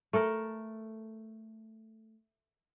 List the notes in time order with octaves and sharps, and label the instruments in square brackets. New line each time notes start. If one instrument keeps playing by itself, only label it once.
[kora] A3 A4 A#4